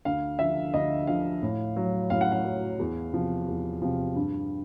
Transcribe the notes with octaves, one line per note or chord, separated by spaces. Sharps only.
D2 F5
D3 F3 E5
D2 D#5
D3 F3 F5
A2
F#3
A2 F5
F#5
F5
F#3
E2
C3 F3
E2
C3 F3
G2